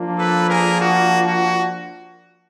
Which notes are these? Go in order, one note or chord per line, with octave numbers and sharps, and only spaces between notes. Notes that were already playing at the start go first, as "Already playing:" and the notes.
Already playing: F3 A#3 D4 F4
A4 B4
G#4 A#4
F#4
F#4